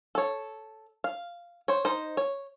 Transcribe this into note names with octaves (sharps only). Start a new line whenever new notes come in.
A4 C#5
F5
C5 C#5
D#4 C5
C#5